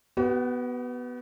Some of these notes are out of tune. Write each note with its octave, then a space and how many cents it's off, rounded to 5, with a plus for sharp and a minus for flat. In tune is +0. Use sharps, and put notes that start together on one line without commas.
B3 +0 F#4 +45